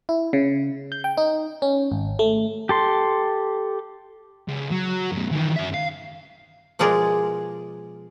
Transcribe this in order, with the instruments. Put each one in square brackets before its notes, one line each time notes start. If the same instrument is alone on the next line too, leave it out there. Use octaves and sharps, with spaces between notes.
[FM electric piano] E4
C#3
G6
G5
D#4
C#4
G#1
A3
[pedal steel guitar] G4 A4 C6
[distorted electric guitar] C#2
F#3
F#2 B2
D#3 E3
F#2 E5
F5
[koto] B2 F3 G#3 G#4 A#4 D5